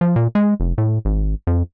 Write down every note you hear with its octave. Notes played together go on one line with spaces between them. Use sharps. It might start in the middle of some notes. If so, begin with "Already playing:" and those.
F3
A#2
G#3
F1
A2
G#1
F2